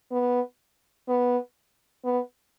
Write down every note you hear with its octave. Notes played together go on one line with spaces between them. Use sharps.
B3
B3
B3